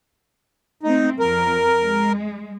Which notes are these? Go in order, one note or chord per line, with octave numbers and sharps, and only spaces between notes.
A3 C4 D#4
F2 A#4
G#3